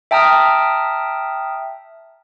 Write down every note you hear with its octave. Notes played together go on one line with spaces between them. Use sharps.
E5 G5 A5 A#5 D#6 F6